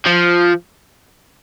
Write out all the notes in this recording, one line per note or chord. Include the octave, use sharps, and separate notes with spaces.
F3